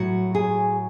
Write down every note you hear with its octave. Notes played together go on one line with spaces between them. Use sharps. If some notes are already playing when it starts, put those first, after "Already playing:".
Already playing: A2 F#3 F#4
G#4